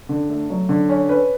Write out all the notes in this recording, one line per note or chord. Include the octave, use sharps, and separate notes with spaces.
D3
A3
F#3
D3
C#4
C#4 B4